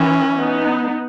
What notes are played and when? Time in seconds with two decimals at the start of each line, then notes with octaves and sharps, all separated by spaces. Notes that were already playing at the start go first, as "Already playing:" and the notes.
Already playing: E3 C#4
0.35 B3 D#4